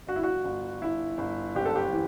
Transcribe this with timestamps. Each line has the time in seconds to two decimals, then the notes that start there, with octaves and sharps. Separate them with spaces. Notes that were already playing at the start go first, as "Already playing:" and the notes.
0.07 G1 F#4
0.16 E4
0.23 F#4
0.45 G1
0.82 G1 E4
1.18 G1
1.55 F#1 G4
1.65 A4
1.76 G4
1.92 E3